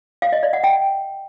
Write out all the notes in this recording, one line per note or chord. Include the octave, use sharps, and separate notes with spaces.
F5
D#5
D5
F#5
G5